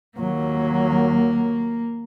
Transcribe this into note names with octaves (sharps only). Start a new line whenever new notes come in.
D#2 F#3 A#3